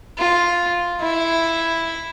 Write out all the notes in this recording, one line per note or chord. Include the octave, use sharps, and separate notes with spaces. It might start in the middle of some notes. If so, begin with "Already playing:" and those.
F4
E4